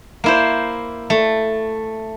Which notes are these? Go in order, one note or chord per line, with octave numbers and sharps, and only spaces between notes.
A#3 E4 C5
A3